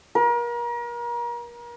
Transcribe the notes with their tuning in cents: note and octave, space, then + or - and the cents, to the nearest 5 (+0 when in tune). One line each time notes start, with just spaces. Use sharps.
A#4 +35